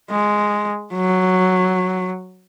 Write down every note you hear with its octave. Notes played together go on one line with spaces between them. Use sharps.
G#3
F#3